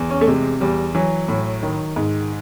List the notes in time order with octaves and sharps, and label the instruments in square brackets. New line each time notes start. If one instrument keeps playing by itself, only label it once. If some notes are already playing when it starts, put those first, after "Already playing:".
Already playing: [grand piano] E2
C#4
A3
C3 G#3
E2 G3
E3 F#3
A2
D#3
G#2